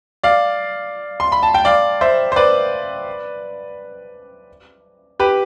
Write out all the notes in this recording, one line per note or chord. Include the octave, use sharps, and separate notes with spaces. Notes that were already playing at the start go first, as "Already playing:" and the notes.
D5 F5
C6
B5
A5
G5
D5 F5
C5 E5
C5
B4 D5
G4 B4